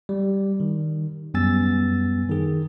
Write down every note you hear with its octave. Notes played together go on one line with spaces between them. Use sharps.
G3
D#3
F#2 G3 B3 G#5 E6 A6
D#3 G#4